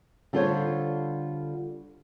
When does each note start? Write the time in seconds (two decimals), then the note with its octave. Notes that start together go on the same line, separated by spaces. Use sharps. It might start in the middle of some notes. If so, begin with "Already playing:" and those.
0.33 D3 G3 F4 A4 C5 C#5